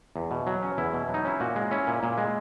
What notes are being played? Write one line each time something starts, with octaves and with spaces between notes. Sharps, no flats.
E2
B2
F#3
C#4
E2 E4
B2
F#3 D#4
C#4 E4
A#2 F#4
G#3
C#4 E4
A#2
A#2
G#3